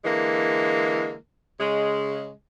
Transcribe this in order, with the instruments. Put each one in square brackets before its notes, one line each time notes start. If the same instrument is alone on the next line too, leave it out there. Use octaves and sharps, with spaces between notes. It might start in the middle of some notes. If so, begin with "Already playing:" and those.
[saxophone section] D3 E3 G#3 A#3
C#3 G#3